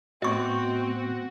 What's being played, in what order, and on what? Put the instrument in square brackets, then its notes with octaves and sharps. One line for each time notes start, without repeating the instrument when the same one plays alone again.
[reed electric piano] A2 A3 B3 [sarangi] C4 [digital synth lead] F#4 [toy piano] D#5 C#6